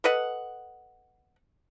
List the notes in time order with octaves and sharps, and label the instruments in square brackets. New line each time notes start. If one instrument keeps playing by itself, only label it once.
[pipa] A4 B4 D#5 F#5